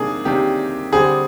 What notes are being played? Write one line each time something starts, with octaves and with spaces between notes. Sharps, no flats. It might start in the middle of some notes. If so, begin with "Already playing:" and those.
Already playing: C3 D#3 A#3 D4 G#4
C3 D#3 A#3 D4 G4
D3 G3 C4 G#4